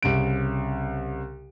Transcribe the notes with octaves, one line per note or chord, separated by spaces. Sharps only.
C2 C#3 D7